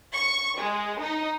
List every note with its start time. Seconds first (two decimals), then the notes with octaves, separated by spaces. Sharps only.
0.13 C#6
0.59 G#3
1.00 D#4